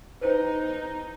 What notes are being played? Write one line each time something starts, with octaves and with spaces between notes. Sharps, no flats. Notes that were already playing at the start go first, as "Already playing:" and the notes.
D#4 B4 C5 G5